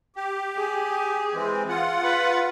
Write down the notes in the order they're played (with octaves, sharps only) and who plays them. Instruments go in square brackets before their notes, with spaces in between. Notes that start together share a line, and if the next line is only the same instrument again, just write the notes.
[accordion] G4
[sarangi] G#4
[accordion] E3 G#3 C4
F4 F#5
[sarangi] B4